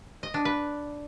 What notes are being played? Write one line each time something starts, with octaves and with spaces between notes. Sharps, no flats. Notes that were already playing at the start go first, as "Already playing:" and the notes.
D#5
D4
B4